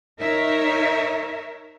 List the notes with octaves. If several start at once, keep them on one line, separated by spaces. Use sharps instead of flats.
D#4 A#4 C#5 E5